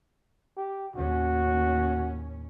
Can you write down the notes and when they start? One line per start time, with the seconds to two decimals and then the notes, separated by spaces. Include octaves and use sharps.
0.57 G4
0.96 D#2 A2 C#4 F#4